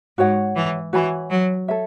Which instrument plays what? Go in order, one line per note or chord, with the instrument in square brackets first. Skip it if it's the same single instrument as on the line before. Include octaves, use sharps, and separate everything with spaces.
[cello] G#2 [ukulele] F#4 C#5 F#5
[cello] E3
[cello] E3 [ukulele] F#4 C#5 G#5 B5
[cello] F#3
[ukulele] A4 C#5 E5